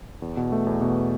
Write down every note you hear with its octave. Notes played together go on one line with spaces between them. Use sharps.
E2
B2
A3
E2
B2